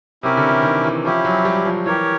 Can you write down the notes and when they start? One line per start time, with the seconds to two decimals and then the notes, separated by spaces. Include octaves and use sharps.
0.23 C3 C#4 E4 G4 A#4
0.37 D3
0.50 E3
0.63 D#3
0.84 E3
1.04 F3 C#4 E4 G4
1.24 F#3
1.45 G3
1.65 F3
1.86 E3 G4 A#4 C#5